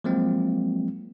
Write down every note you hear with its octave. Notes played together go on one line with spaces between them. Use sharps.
F3 F#3 G#3 A#3 C4